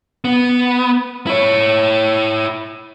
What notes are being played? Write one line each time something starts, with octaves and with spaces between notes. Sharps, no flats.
B3
E4 C#5